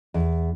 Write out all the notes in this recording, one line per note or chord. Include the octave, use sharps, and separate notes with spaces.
E2